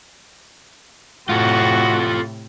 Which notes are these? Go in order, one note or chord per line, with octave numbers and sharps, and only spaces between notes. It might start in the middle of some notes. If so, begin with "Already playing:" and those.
A2 C3 F4 F#4 A4